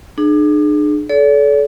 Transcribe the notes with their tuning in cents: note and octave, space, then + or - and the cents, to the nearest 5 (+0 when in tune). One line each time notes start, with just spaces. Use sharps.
D4 +35 G#4 +20
A4 -30 D5 -45